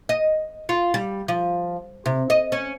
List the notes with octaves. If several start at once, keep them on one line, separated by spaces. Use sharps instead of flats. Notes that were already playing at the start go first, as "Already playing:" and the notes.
D#5
F4
G3
F3
C3
D#5
C#4